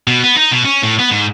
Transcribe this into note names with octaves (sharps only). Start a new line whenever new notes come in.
B2
B3
D#4
B2
C#4
A2
B3
G#2